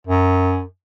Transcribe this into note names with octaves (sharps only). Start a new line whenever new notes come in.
F#2